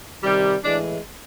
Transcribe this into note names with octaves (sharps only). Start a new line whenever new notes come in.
C3 D#3 G3
A2 E3 G#3 D4